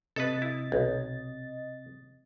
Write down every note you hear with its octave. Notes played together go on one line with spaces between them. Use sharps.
C3 A4 B4 D#5 A6
E4
B1